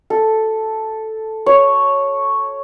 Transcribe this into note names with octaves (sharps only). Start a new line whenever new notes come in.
A4
C#5